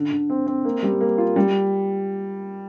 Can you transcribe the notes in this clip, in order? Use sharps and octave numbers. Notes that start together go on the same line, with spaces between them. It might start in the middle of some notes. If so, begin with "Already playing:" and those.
Already playing: D3
D3
C4
C4
A#3
G3
A#3
F4
G3